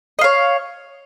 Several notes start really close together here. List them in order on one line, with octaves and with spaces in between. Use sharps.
D#5 F5 C#5